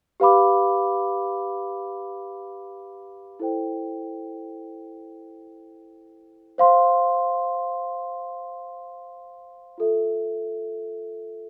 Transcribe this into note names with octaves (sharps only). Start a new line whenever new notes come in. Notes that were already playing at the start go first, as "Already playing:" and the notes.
G4 B4 F5 B5 D6
E4 A4 C5 G5
C5 F5 C6
F4 A4 E5